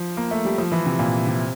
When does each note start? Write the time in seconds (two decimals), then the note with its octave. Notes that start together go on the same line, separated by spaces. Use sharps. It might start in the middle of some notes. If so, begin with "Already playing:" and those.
Already playing: F3
0.17 A#3
0.31 A3
0.45 G3
0.58 F3
0.72 E3
0.86 C3
0.99 A#2
1.27 C3